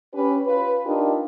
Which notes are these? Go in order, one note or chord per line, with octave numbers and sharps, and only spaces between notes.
C#4 G4 B4
F4 B4
D4 D#4 F4 G4 A#4